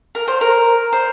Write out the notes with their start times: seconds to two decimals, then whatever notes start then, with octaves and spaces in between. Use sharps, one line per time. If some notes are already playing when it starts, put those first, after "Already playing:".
0.15 A#4
0.28 C5
0.41 A#4
0.93 C5